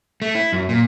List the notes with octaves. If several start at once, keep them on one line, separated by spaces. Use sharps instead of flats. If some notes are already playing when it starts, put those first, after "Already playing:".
A3
E4
F#2
A#2